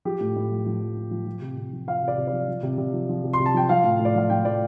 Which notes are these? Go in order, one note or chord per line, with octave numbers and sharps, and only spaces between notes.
F3 G4
A2
A2
F3
F3
A2
A2
F3
F3
C3
C3
F3
F3 F5
C3
D5
C3
D5
F3
F3
C3
C3
F3
F3
C3
C6
C3
A5
F3 G5
F3 F5
A2
A2
D5
F3 F5
F3 G5
A2 D5